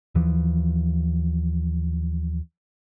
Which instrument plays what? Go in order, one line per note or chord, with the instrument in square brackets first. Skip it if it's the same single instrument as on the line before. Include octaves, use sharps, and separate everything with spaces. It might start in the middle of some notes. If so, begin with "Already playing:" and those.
[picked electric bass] D#2 E3 F3